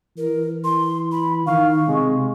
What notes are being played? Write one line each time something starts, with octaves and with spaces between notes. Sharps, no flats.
E3 A#4
C6
B5
D#3 F5 C#6
C3 G#3